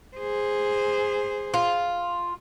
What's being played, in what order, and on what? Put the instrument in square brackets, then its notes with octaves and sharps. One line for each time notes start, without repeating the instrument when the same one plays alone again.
[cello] G#4 C5
[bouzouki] F4